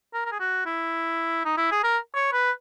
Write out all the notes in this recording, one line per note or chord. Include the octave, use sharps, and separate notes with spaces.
A#4
A#4
G#4
F#4
E4
D#4
E4
G#4
A#4
C#5
B4